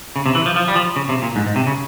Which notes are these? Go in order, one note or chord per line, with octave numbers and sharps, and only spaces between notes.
C#3
C3
E3
F3
F3
G3
F3
C#3
C3
A#2
G#2
G#2
C3
C#3